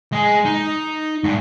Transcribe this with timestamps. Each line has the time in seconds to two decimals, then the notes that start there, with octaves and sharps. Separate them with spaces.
0.12 G#3 G#4
0.45 D#4
1.24 G#2 G3